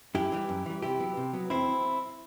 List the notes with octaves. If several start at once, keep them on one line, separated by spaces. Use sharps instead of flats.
F#2 E4 G4
E3 G3
F#2
E3 G3
C3 E4 G4
F#3 B3
C3
F#3 B3
E2 C4 E4